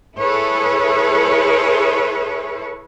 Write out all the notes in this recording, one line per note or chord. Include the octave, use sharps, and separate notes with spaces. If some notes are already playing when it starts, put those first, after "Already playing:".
E4 G#4 A4 B4 C#5